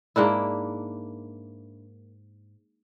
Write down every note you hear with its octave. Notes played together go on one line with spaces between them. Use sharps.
G#2 A#3 D4 E4